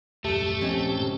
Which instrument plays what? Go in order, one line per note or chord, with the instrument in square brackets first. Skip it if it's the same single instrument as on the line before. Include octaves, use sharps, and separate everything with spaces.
[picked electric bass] D#1 F#2 [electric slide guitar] A3 [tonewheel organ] G4 A5
[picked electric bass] D#1 F3 [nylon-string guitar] C4 C#4 D#5
[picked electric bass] G#2 C#3